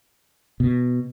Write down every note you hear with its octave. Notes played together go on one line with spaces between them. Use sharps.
B2